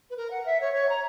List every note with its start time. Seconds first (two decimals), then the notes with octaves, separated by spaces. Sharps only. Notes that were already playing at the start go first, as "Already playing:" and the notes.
0.10 B4
0.16 A#4
0.30 F#5
0.45 E5
0.60 C#5
0.73 C#5
0.88 A#5